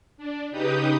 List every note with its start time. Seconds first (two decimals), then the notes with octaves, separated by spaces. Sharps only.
0.18 D4
0.51 C#3 D#4 G4 B4 D#6 G6